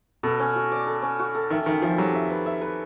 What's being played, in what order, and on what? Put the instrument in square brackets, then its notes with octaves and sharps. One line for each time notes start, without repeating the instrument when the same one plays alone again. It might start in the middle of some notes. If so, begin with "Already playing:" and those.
[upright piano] B2 [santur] A4
[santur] C#4
F#4
D5
A4
C#4
F#4
A4
[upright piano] D#3 [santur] E5
[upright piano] D#3 [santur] E5
[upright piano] F3 [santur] E5
[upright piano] F#3 [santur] G4
[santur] E5
B4
E5
B4